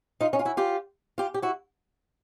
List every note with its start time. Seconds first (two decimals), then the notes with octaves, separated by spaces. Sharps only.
0.21 D#4 F4
0.33 C#4 D#4
0.39 F4
0.45 E4 F#4
0.57 F4 G4
1.18 F4 G4
1.34 G4
1.42 E4 F#4